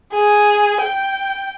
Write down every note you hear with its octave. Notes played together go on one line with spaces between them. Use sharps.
G#4
G5